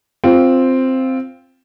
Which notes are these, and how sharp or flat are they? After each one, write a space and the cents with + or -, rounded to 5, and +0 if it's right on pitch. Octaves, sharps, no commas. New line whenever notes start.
C4 +0 F4 +0